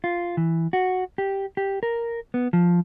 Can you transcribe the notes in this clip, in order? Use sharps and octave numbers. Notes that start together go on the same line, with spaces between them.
F4
E3
F#4
G4
G4
A#4
B3
F3